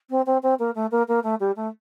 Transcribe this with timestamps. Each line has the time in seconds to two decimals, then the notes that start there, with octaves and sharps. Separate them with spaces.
0.10 C4
0.26 C4
0.43 C4
0.59 A#3
0.75 A3
0.91 A#3
1.08 A#3
1.23 A3
1.40 G3
1.56 A3